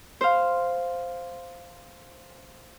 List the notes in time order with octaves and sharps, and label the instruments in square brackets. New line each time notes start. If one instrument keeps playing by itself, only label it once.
[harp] C5 F5